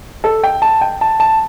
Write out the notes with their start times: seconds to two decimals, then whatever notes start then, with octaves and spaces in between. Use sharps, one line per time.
0.24 A4
0.44 G5
0.62 A5
0.81 G5
1.01 A5
1.20 A5